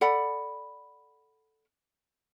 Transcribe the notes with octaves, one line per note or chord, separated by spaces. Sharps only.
A4 D5 F#5 B5